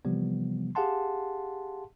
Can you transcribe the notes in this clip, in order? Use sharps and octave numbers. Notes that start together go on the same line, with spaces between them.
C3 E3 F3 G3 B3
G4 G#4 F5 F#5 A5 C6